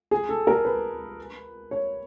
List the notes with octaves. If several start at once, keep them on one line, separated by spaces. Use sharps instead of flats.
G#4
A4
A#4
B4
C#5